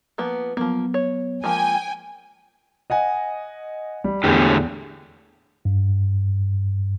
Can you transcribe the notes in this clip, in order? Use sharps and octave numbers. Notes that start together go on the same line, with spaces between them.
F3 A#3 B3
F3 F#3 A#3 B3
C#5
F3 G#3 A#3 G5 G#5
D#5 F#5 G#5
G3
E2 A2 D3 G4 G#4 G6
G2